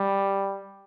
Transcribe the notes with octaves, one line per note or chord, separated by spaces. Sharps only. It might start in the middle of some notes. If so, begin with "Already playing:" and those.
Already playing: G3